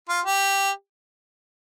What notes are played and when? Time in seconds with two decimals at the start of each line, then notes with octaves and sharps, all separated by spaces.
0.09 F4
0.25 G4